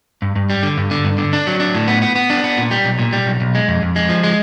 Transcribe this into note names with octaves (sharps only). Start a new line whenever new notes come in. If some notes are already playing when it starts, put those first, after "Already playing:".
G2
G2
G3
D3
G2
D3
G2
D3
D4
F#3
D4
A2
B3
B3
B3
D4
B3
A#2
G3
B1
A#2
G3
B1
B1
G#3
F2
F2
G#3
F3
G#3